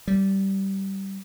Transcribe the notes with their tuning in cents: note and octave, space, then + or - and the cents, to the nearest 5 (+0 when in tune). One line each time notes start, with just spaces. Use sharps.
G3 -15